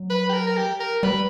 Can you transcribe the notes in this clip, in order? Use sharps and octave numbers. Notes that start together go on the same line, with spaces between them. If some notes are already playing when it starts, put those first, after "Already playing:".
Already playing: F#3
B4
G4
A#4
A#4
G4
A#4
G3 B4